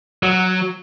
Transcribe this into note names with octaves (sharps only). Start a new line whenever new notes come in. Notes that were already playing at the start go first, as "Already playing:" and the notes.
F#3